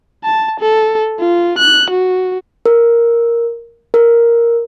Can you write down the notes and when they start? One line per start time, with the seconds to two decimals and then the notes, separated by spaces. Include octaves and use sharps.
0.24 A5
0.60 A4
1.19 F4
1.58 F#6
1.90 F#4
2.66 A#4
3.94 A#4